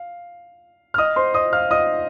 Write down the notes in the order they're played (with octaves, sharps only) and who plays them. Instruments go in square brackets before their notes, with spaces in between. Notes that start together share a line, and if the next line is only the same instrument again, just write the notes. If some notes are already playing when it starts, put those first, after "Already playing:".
Already playing: [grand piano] F5
F6
D#5 D#6
C5 C6
D#5 D#6
F5 F6
D#5 D#6